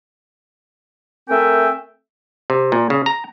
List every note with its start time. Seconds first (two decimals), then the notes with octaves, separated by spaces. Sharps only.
1.29 A3 C4 A#4 E5 G5 G#5
2.50 C3
2.72 A#2
2.90 C#3
3.06 A#5